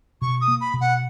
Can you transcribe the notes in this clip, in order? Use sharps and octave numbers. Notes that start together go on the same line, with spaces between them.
B2 C#6
D#6
A#3
B5
B2
F#5